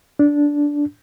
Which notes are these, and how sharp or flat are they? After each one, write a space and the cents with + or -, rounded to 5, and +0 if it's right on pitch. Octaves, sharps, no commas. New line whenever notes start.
D4 -10